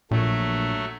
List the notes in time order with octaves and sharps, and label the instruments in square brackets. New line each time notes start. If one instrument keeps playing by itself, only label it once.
[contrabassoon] A#1 [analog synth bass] A#2 [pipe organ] F#3 A3